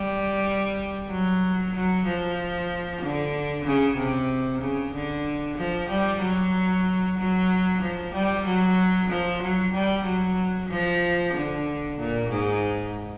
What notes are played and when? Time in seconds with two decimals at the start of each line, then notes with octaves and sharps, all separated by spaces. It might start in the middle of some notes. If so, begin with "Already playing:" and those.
Already playing: G3
1.10 F#3
1.74 F#3
2.06 F3
3.01 D3
3.65 C#3
3.97 C3
4.61 C#3
4.93 D3
5.57 F3
5.89 G3
6.22 F#3
7.17 F#3
7.81 F3
8.14 G3
8.45 F#3
9.09 F3
9.41 F#3
9.73 G3
10.05 F#3
10.69 F3
11.33 D3
11.97 A#2
12.29 G#2